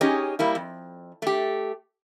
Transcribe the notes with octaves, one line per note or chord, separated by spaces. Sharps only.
C#4 D#4 G4 G#4 C#5 D#5
G3 A#3 E4
F2
A3 G4